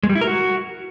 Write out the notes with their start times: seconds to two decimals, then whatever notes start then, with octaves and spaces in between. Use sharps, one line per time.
0.03 G#3
0.09 G3
0.15 E4
0.21 A#4
0.27 F#4